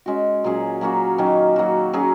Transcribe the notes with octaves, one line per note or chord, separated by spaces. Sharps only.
G#3 C#4 F#4
A#2 F#3 C#4 G#4
F#3 A#3 C#4 F#4
D#3 F#3 C#4
F#3 A#3 F#4
F#3 C#4 G#4